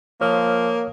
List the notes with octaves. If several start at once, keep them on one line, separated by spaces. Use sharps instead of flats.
F3 A#3 C#5 D#6 F6